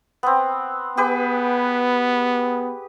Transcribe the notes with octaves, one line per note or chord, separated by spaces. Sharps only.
B3 C4
B3 G4 G#4 B4